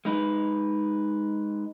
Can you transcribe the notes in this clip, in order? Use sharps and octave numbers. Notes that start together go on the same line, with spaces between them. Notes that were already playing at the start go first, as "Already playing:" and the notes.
G#3 D#4 B4